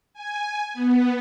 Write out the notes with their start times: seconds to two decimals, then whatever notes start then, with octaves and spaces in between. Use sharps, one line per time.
0.14 G#5
0.74 B3